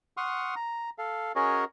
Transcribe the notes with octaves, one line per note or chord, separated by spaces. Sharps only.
F#5 C6 C#6 D#6 F6
A#5
A4 F5
C#4 F#4 G#4 A#4 C#5 D#5